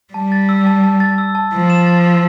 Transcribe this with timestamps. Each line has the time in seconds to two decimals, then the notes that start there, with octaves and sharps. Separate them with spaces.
0.14 G3 A5
0.32 A6
0.49 E6
0.66 A5
0.84 A5
1.00 A6
1.18 E6
1.35 A5
1.53 F3 E6
1.70 E7
1.87 A6
2.04 E6